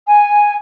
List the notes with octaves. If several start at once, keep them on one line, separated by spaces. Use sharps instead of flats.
G#5